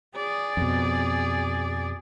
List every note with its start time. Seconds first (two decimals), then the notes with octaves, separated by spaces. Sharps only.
0.16 G#4 D5
0.57 F2 B2